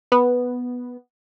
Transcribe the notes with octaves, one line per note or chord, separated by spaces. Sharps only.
B3